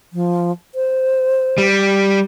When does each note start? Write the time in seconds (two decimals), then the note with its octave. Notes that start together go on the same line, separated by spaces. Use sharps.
0.13 F3
0.75 C5
1.58 G3